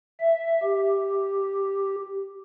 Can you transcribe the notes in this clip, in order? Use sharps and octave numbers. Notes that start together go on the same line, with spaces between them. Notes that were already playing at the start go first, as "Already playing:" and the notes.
E5
G4